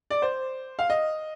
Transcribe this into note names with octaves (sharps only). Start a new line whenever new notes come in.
D5
C5
F5
D#5